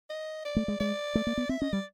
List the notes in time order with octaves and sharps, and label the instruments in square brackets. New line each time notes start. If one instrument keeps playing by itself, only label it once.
[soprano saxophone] D#5
D5
[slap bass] A3
G#3
[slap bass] G#3 [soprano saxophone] D5
[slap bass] A3
A#3
B3
[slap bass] C4 [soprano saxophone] E5
[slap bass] C#4 [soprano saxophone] D#5
[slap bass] G3 [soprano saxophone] D5